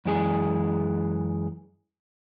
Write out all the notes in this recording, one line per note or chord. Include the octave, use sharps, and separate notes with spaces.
F#2 E3 G#3 G#4